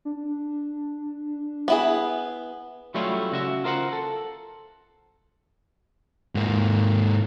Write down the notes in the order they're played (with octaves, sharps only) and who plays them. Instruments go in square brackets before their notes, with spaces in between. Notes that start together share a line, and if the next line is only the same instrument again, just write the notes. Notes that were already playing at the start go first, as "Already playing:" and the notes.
[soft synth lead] D4
[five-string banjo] B3 E4 G#4
[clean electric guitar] F#3 G3 A3 C#4 E4 F4
C#3 F#4 E5
F4 A#4 C5 D#5 F#5
A4
[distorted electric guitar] G#2 A#3